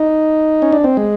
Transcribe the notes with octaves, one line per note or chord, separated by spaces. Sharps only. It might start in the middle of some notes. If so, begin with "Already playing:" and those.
Already playing: D#4
C#4
D4
C4
G#3